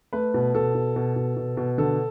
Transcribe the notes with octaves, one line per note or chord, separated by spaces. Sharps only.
A3 B4
B2
B2 A4
B2
B2
B2
B2
B2
D3 A4